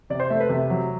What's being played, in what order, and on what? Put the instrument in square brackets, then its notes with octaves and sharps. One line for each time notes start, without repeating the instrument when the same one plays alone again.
[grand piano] C3 D5
C5
A3 E5
B4
C3
F#3